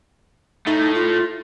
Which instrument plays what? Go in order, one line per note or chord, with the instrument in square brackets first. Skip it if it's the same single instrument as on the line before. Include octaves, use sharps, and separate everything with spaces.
[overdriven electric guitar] A2 A3 [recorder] D#4
[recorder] F4